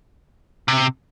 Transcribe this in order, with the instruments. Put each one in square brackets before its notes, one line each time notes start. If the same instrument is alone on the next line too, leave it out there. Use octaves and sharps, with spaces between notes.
[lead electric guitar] C3